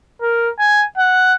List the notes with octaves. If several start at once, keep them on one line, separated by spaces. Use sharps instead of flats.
A#4
G#5
F#5